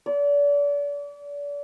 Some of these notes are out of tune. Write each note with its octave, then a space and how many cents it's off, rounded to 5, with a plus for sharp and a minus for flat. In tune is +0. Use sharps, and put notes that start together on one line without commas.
D5 -35